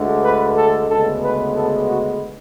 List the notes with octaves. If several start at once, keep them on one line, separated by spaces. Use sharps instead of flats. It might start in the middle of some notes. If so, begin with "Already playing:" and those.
Already playing: D2 D3 G#3
B4
A4
D2 C#3 G#3 B3 A4
B4
A4
F#4